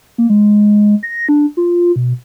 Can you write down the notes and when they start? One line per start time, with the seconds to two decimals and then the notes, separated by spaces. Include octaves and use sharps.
0.18 A#3
0.30 G#3
1.03 A#6
1.29 D4
1.57 F4
1.96 B2